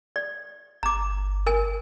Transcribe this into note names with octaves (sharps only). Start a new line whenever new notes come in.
D5
G1 A#5 D6
A#4 G#5